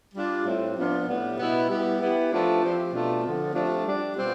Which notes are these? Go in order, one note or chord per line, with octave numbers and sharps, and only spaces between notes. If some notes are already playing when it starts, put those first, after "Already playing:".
G3 D4 F4
A2 G3 C4
F3 B3 D4 F4
A2 G3 B3
B2 B3 E4 G4
G3 B3 E4 G4
E3 B3 E4 G4
F3 A3 D4 F4
F3 C4 G4
B2 A3 D4 F4
D3 F3 C4
F3 A3 D4 G4
G3 D4 G4
B2 G3 C4 F4